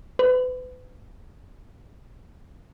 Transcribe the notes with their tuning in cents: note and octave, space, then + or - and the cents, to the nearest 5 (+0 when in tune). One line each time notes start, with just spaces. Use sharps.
B4 +35